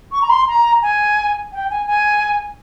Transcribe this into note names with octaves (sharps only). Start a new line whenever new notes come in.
C#6
A#5
C6
A#5
G#5
G5
G#5
G#5